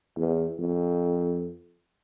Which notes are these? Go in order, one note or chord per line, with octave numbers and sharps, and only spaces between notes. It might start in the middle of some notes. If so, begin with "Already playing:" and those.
E2
F2